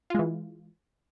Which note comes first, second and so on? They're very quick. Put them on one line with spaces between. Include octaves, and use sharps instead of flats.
F4 G#3 E3